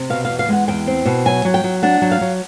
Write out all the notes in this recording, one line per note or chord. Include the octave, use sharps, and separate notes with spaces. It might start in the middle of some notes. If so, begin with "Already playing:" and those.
Already playing: C3
B2 F5
E2 F5
F5
G#3 F#5
E2 G5
C4
B2
F#3 G#5
F#3
G5
F#3
D4 F#5
F#3
F5
F#3